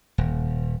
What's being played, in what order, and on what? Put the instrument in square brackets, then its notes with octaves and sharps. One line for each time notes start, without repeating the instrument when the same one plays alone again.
[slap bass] D#1